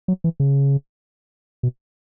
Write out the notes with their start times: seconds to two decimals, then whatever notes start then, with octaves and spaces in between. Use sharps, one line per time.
0.08 F#3
0.24 E3
0.40 C#3
1.63 B2